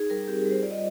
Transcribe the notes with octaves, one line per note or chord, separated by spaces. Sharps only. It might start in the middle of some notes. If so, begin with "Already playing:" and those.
Already playing: D#4 G#4
G3 A#4
C4 G4
G#4
G3
C5
F4 D5
D#5